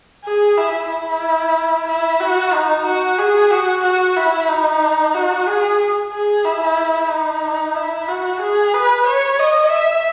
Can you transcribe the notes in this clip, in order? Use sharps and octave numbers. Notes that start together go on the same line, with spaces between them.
G#4
E4
E4
E4
F#4
D#4
F#4
G#4
F#4
F#4
E4
D#4
F#4
G#4
G#4
E4
D#4
E4
F#4
G#4
B4
C#5
D#5
E5